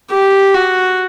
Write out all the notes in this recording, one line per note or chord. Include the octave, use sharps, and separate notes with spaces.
G4
F#4